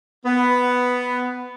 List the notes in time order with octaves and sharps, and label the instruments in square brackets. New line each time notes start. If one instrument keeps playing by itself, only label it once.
[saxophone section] B3